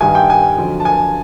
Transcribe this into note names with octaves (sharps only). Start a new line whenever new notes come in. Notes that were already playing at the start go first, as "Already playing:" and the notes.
G2 D#3 G3 G#5
G5
G#5
F2 D3 F#3
A5
G#5